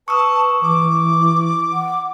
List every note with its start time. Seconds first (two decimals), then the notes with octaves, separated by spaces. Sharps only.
0.08 B4 A5 C#6 D#6 E6
0.61 E3 D6
1.73 F#5